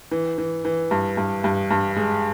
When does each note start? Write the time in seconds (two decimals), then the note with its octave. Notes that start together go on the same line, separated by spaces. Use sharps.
0.11 E3
0.38 E3
0.65 E3
0.91 G2
1.17 G2
1.44 G2
1.71 G2
1.96 G#3